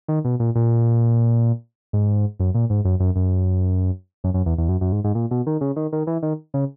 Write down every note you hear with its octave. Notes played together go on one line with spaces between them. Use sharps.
D#3
B2
A#2
A#2
G#2
F#2
A#2
G#2
F#2
F#2
F#2
F#2
F#2
E2
E2
F#2
F#2
G#2
G#2
A#2
B2
D#3
C#3
D#3
D#3
E3
D#3
C#3